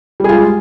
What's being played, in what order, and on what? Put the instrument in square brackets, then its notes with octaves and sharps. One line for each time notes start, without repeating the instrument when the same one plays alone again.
[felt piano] G3
G#4
F4
G#3